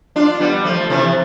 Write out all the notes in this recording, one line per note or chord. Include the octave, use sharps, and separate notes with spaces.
D4 F4
G3 B3
F3 A3
C3 E3